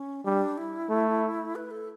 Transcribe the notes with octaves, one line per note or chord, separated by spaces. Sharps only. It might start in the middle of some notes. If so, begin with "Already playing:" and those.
Already playing: C#4
G3 D4
E4
A3
B4
A4